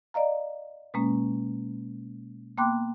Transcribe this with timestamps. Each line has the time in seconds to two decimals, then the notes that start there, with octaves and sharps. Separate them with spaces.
0.14 D5 D#5 F5 A#5
0.94 B2 G#3 A#3 C#4
2.58 A#3 B3 G5 C6 D6 F#6